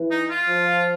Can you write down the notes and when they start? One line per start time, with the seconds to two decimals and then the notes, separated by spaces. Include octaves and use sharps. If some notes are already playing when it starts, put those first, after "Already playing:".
Already playing: E3
0.11 D#4
0.30 F4
0.48 F3